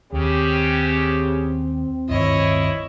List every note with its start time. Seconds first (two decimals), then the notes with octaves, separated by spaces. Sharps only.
0.12 D#2 C#3 C4 G4
2.09 D1 G2 D#3 E4 C#5 D#5